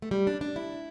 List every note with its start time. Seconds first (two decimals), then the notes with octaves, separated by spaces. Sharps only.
0.02 A3
0.11 G3
0.27 D4
0.41 D4
0.56 E4